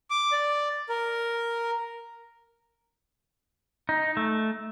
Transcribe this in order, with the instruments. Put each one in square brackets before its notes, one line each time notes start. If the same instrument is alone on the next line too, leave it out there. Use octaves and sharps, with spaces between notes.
[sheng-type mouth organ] D6
D5
A#4
[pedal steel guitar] D#4
A3